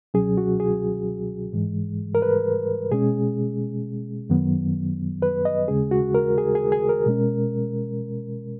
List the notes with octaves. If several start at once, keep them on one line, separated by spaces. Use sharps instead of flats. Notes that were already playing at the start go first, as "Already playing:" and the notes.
C#2 B2 F#3 C#4 G#4
F#4
G#4
G#2 E3 G#3
A#4
B4
B2 G#3 C#4 G#4
F#2 D#3 F#3 B3
B4
D#5
D#2 C#3 G#3 C#4 G#4
F#4
A#4
G#4
G#4
G#4
A#4
B2 G#3 C#4